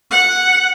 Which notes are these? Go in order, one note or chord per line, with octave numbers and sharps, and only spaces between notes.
F#5